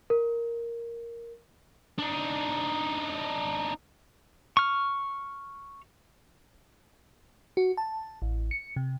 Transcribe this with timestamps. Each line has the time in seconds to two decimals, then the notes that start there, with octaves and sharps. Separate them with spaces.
0.10 A#4
1.99 D4 D#4
4.57 C#6 F6
7.57 F#4
7.77 A5
8.22 A1
8.51 C#7
8.76 C3